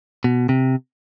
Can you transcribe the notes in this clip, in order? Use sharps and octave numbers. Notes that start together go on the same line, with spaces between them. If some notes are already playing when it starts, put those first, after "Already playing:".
B2
C3